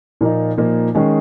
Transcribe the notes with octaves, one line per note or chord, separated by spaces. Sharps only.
A#2 F3 A#3 D#4
A#2 F3 A#3 D#4
D#3 G#3 C#4 G#4